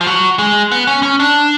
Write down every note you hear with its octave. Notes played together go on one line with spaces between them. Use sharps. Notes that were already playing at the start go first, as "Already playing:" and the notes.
F3
F#3
G#3
B3
C#4
C#4
D4